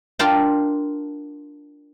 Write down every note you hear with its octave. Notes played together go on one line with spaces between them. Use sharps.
D4 F4 A#4 F5 G5 A5